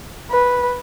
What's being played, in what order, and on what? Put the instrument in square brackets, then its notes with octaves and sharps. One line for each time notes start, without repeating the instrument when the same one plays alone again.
[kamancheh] B4